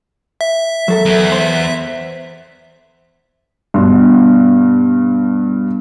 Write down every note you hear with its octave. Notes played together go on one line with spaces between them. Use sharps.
E5
F#3 A4 A#4
E2
C5
G2 B2 C6